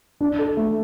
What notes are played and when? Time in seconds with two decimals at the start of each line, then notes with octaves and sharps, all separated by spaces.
0.21 D4
0.39 A4
0.57 A3